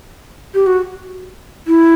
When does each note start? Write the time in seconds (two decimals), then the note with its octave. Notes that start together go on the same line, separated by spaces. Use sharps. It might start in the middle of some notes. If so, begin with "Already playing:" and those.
0.54 G4
0.67 F#4
1.67 E4